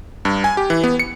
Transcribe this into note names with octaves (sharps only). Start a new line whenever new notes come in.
G2
G#5
G4
E3
B3
C#7